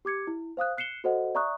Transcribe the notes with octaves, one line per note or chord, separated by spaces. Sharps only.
G4 D6 G#6 C#7
E4
C5 F5 D#6 F#6
F#6 C7 C#7 E7 G7
F#4 A4 C5 D#5 F#5
D5 E5 A#5 C#6 D#6 F#6